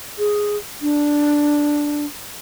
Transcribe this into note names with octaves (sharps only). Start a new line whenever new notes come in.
G#4
D4